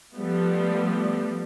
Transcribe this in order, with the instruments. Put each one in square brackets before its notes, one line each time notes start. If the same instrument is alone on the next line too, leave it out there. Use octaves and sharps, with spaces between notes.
[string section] F3 G3 A3 B3